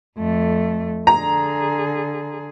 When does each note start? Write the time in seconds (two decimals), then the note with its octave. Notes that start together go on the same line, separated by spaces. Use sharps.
0.18 F2 A3
1.07 D3 G#4 A#5